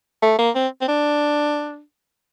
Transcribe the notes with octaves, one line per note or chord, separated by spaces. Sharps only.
A3
A#3
C4
C4
D4